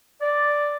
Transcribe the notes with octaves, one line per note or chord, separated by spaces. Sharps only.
D5